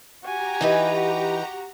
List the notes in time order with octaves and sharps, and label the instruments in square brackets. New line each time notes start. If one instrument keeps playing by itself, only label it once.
[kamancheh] F#4 G#5 [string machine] G4 A#5
[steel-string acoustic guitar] E3 D#4 B4
[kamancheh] F#4